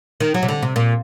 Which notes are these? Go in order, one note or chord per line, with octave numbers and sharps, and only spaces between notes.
D#3
F#3
C3
D3
C3
A#2